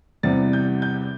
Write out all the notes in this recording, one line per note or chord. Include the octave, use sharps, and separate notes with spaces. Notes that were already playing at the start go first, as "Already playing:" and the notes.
E2 C3 G3 A6
G6
G6